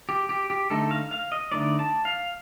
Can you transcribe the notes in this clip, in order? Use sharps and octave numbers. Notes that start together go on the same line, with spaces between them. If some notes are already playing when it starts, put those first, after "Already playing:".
G4
G4
G4
D3 A3 D#4 A4
F5
F5
D#5
D3 A3 D#4 D5
A5
F5